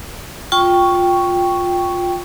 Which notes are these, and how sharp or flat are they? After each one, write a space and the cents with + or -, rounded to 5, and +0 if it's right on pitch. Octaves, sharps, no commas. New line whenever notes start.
F4 +15 G5 +0 C#6 +0